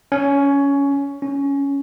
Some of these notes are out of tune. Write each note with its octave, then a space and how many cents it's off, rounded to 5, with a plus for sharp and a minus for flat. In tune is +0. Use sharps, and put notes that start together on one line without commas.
C#4 +15
C#4 +10